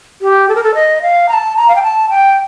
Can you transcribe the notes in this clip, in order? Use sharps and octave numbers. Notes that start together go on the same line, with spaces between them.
G4
A4
A#4
A4
D#5
F5
A#5
A5
A#5
F5
G5
A5
G5